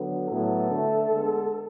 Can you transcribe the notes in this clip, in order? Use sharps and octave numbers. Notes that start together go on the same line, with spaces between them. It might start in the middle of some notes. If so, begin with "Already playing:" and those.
Already playing: D3 F#3 B3
A2 F#3 B3 A4
D3 A3
D3 G#3 B3